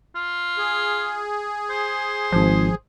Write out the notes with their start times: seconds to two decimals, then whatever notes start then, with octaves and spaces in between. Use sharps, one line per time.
0.15 F4
0.58 G#4
1.70 C5
2.32 G#1 F3